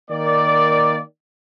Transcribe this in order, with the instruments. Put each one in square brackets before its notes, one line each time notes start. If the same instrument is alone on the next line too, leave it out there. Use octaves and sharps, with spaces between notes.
[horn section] D#3 A#3 D5